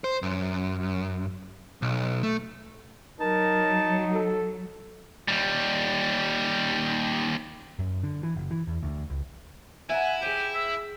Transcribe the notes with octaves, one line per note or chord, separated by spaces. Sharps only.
C5
F#2
B1
A3
F#3 D#4 A#4 A5
A4
D#2 G3
F#2
D3
E3
F#1
E3
E2
D2
C#2
B3 E4 F#4 E5 G#5 A#5
G4 G#4 C5 G5 G#5 D#7
E5